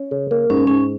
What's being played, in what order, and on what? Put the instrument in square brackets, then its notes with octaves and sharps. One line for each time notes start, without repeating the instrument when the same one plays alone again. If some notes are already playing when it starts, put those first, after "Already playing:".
Already playing: [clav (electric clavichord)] C#4
C#3
A#3
[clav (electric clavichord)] G#2 [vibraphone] C#4
[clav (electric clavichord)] G#2 [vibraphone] C#4